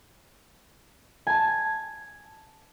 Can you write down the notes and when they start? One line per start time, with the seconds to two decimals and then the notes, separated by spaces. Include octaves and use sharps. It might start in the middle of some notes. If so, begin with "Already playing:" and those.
1.27 G#5 A5